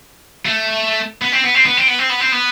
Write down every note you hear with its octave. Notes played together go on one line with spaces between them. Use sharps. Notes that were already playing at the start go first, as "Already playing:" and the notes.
A3
B3
C4
B3
C4
B3
C4
B3
C4
B3
C4
B3